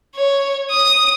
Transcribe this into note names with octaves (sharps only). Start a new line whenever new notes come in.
C#5
D#6